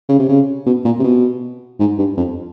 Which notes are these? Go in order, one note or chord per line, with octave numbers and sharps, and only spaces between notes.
C#3
C3
C#3
B2
A#2
C3
B2
G#2
G2
F2